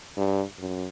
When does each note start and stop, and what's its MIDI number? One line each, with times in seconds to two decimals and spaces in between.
0.17 0.43 43
0.59 0.86 42